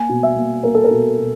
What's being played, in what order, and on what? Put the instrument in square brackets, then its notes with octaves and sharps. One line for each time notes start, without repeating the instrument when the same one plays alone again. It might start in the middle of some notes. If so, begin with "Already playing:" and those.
Already playing: [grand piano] A#3 G#5
B2
E5
A#3
A#3 A#4
A4
A#4
B2
B2